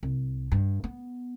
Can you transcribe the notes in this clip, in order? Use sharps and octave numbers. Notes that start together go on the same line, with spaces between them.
C2
G2
B3